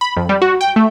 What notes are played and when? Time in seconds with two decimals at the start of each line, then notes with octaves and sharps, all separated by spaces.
0.01 B5
0.17 F2
0.29 G3
0.42 F#4
0.61 G5
0.76 A3